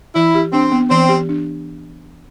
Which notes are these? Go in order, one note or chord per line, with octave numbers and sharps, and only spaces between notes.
E3 E4
G4
C4 D4
B3
E3 C4
G4
D4